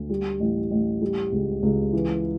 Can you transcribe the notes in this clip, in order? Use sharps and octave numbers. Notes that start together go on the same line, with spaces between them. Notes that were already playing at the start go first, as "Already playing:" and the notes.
Already playing: D2
G3
A1
A1
G3
C#2
C#2
E3